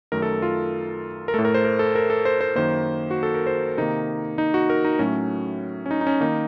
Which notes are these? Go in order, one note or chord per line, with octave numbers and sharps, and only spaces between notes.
F#2 D#3 A3 A#4
A4
F4
A#4
A2 A3 A4
A#4
C5
A#4
A4
A#4
A4
C5
C5
F#2 D#3 A#3 C5
F#4
A4
A#4
C5
C3 D#3 A#3 D#4
D#4
F#4
A#4
D#4
A2 F#3 A3 C#4
C#4
D#4
D#4
C#4
D#3 A#3 D#4